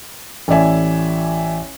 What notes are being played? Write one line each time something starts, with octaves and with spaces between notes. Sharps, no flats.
A1 E4 A4 D5 E5 G#5